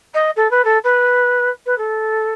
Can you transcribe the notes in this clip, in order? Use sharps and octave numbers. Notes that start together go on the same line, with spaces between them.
D#5
A4
B4
A4
B4
B4
A4